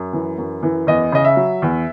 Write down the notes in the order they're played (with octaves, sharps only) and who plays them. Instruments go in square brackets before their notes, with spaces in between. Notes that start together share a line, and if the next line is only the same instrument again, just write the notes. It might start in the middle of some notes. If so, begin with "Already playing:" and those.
Already playing: [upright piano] F#2
E3
F#2
E3
E2 D#5
C#3 D#5
E5
F#3
E2